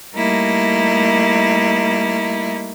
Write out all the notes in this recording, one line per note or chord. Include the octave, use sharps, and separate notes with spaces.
G3 A3 A#3 D#4 E4